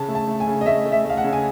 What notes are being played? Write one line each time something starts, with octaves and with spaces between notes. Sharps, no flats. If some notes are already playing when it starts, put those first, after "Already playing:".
Already playing: C#3 A5
A3
A5
A3
G#5
C#3
D#5
A3 E5
A3
E5
A3 F5
F#5
C#3
G#5